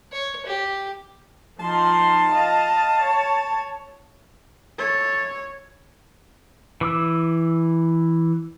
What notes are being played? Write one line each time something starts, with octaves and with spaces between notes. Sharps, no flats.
C#5
G4
F3 D#4 A5 C6
D#5 F5
C#5
A4 C#5
E3 D6 E6